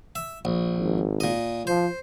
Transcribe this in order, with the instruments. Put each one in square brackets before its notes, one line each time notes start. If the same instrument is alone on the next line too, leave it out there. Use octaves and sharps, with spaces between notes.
[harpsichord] E5
A#1
[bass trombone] G#1
[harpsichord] A#2 D#5
[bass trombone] F3 [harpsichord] C5